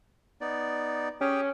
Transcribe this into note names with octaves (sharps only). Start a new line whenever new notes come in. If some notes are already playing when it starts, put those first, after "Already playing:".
B3 D#4 D5
C#4 G4 G#4 G5